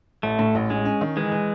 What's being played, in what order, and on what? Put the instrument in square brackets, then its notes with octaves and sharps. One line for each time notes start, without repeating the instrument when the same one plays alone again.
[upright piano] A1 [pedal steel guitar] A3
[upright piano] A2
A1
[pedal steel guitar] G#3 [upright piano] C#4
[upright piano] C#4
D#3
[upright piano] E3 [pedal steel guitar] G#3
[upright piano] E3